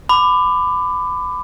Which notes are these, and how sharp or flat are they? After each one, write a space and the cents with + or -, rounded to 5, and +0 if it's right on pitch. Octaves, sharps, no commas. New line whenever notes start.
B5 +25 D6 +15